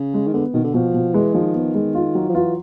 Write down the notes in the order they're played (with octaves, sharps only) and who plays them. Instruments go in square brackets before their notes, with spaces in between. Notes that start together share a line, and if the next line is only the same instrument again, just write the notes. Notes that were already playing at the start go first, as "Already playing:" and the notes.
Already playing: [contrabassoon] C#3
[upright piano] G#3
[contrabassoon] D#3
[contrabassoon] D3 [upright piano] B3
[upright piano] B2 [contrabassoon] D#3
[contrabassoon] D3
[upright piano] B2 [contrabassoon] F3
[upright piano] B2
[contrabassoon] E3 [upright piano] G#3
[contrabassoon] D#3 [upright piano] F3
[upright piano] B3
G#3
F4
F#3
[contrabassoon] F3
[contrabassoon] E3 [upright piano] F4